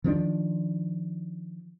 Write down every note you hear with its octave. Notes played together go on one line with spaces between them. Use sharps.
D#3 F3 G#3 D4